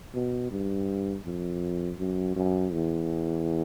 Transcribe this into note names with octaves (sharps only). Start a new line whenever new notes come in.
B2
G2
F2
F#2
F#2
E2